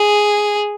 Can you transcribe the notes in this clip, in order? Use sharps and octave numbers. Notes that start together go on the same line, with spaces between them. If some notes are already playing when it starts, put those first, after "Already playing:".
Already playing: G#4